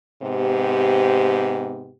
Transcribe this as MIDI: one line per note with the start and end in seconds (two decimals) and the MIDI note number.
0.22 1.92 44
0.22 1.92 48
0.22 1.92 59
0.22 1.92 67